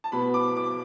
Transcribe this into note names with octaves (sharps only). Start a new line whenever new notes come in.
A5
B2 B3 B5
D6
D6